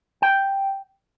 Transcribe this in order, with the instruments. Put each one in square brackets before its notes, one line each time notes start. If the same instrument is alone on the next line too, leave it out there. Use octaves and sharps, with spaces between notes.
[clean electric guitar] G5